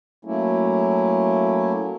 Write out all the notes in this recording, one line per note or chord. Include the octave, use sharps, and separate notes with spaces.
F#3 A3 A#3 C#4 E4